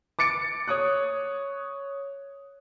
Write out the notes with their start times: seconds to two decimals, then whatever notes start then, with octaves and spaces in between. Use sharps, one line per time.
0.19 D6 A6 C#7 D7
0.68 C#5 D#6 F#6